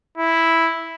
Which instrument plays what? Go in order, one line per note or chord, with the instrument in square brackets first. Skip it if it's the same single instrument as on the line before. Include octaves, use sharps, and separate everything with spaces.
[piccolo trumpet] E4